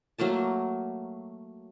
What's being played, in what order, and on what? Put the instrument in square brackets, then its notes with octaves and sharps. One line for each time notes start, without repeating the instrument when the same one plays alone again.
[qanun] F#3 A3 A#3 A5